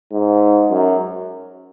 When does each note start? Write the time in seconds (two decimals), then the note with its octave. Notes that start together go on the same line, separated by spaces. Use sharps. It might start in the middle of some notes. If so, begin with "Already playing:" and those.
0.13 G#2
0.70 F#2